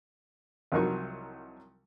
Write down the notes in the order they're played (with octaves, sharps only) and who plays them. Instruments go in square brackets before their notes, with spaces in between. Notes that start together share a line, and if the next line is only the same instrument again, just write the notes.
[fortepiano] C2 F3 F#3 D#4 A#4 C#6